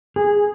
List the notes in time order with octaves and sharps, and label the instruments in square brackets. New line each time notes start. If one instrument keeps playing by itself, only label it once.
[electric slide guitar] G#4